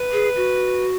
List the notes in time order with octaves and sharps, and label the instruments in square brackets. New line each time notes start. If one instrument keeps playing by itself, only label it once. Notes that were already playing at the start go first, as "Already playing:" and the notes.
Already playing: [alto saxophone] B4
[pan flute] G#4
F#4